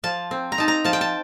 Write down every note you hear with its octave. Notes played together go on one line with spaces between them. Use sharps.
F3 A5
C4
A#5
D#4 A5
A#5
F3 A5
G5
A5